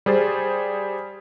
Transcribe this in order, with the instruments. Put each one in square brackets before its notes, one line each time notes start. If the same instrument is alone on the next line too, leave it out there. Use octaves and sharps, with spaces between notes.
[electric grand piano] G3 G#4 C5 A6